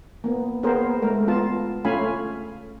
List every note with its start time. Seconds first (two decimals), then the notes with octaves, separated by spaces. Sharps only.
0.24 A#3 B3
0.63 A#3 B3 G#4 A#4 C5
1.02 G#3 A3 A#4
1.27 B3 F4 A5
1.85 A3 C#4 F4 F5 G#5 B5